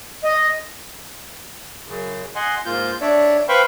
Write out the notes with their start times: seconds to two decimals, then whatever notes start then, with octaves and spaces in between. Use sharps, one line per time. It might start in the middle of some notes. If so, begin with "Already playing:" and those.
0.24 D#5
1.88 F#2 C#3
2.35 D#5 F#5 G#5 C6
2.65 G#2 A#3 F4 G6
3.01 D4 C#5 D5 E5
3.48 B4 C5 F5 G5 B5 C#6